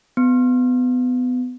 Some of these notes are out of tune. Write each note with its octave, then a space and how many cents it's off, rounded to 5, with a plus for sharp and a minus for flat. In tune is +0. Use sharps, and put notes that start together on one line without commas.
B3 +25